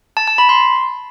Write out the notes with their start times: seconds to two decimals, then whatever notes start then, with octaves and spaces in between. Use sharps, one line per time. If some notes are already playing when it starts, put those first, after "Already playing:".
0.17 A5
0.27 A5
0.38 B5
0.49 C6